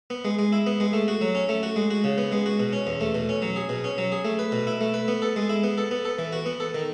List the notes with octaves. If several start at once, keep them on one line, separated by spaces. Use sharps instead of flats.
B3
G#3
G#3
E4
B3
G#3
A3
F#4
F#3
C#4
A3
F#4
G#3
F#4
C#3
B3
G#3
F#4
B2
C#4
E2
A3
B2
C#4
F#3
G#4
B2
C#4
F#3
G#4
A3
B4
B2
E4
A3
B4
B3
A4
G#3
E4
B3
A4
B3
A4
E3
F#4
B3
A4
D#3